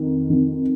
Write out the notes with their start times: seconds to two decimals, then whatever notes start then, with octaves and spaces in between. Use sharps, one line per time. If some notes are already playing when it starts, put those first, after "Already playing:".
Already playing: F2 D#3
0.30 F2 D#3